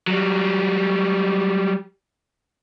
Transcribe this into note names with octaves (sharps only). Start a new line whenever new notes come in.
F#3 G3